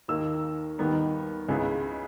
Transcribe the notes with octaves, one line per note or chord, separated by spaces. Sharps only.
D#2 D#3 A#3 E6
D#2 D#3 G3 B3 D#4
C#2 C#3 G#3 B3 E4